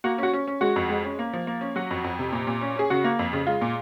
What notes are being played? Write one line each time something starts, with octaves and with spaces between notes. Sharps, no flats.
A#3 F#4
C#4 F#4
C#4
C#4
G#3 F#4
F2
G#3
C#4
A#3
F3
A#3
C#4
F#3 F#4
F2
F2
C3
A#2
A#2
C#4
C#4 G#4
C#3 F#4
A#3
F2
C#3
G#3 F4
A#2